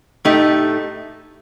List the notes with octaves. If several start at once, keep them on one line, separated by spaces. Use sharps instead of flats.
A2 A3 D#4 G4